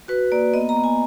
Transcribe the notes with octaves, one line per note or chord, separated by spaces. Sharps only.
F#4 B4
A#3 D5
B3 D#5
A#5
B3
G#5